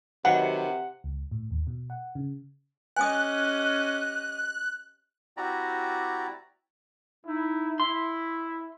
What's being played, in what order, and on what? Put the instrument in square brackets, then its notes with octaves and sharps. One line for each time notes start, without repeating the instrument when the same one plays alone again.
[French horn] C3 [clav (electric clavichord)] D#3 F#3 B4 [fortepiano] F#5
[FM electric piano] C#2
A2
D#2
B2
F#5
C#3
[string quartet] C#4 G4 D#5 [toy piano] G#5 D#6 [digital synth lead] F#6
[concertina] C4 E4 F#4 G4 D5 A#5
[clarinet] D#4 [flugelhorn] E4
[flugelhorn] E4 [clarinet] E5 [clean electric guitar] C6